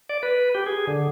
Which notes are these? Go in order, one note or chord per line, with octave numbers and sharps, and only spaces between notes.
D5
B4
G4
G#4
D3